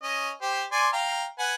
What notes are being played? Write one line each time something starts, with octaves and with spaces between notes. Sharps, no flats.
C#4 D#5
G4 C5
D5 G#5 C6
F5 G5 A#5
B4 F#5 G#5